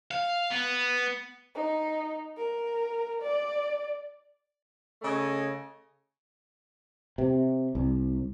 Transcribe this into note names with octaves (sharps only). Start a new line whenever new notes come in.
F5
B3
D#4
A#4
D5
C#3 A3 C#5 D#5
C3
C2